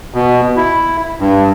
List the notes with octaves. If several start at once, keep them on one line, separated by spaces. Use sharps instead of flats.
B2
E4
G2